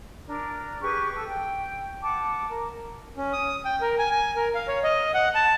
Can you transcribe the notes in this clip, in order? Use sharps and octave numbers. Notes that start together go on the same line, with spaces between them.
D4 A#4
G4 G#4 B4 C#6
A4
G5
F#5 A5 D6
A#4
C#4
D#6
G5
A#4
G#5
G#5
A#4
F5
C#5
D#5
F#5
A5